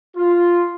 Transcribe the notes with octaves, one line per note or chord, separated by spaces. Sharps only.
F4